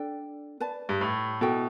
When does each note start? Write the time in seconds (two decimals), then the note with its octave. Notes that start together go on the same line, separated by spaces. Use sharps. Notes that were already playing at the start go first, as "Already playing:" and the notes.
Already playing: D4 A4 D5 G5
0.60 B4 D5 A5
0.89 G2
1.01 A2
1.41 B2 E4 A4 E5 G5